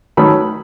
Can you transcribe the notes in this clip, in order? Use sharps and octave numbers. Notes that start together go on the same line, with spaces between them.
D#3 F#3 A3 C#4 B5